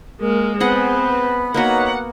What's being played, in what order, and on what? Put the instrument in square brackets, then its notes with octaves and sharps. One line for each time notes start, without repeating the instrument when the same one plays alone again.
[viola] G#3 A#3 [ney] A#4
[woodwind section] B3 B4 [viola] C4 [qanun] G#4 D#5 F#5 [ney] B5
[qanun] A#3 B3 F#4 [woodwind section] D#4 B4 C#5 [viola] F#5